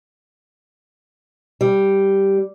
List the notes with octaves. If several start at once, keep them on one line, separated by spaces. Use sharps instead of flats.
G3